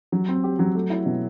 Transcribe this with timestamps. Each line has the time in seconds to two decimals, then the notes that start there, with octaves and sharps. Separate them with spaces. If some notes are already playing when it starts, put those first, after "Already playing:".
0.12 F#3
0.29 C4
0.44 G4
0.59 F#3
0.75 A3
0.90 E4
1.06 B2